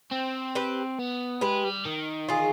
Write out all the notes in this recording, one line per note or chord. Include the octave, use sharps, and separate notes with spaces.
C4
G4 B4
B3
G#3 G4 B4
G3
D#3
F4 G#4